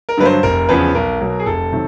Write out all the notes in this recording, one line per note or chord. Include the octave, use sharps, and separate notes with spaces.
A#4
G2 D3 F#3 B4
C5
F1 A#4
E2 C#3 F3 B4
B1 A#4
B2 F#3
G#4
F1 A4
C3 D#3 F#3